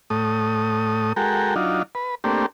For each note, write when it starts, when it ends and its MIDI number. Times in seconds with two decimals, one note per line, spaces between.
0.10 1.13 45
0.10 1.13 57
0.10 1.13 87
1.16 1.55 56
1.16 1.55 66
1.16 1.55 69
1.16 1.55 70
1.16 1.55 79
1.56 1.83 54
1.56 1.83 62
1.56 1.83 63
1.56 1.83 65
1.95 2.15 71
2.24 2.46 57
2.24 2.46 58
2.24 2.46 60
2.24 2.46 62
2.24 2.46 67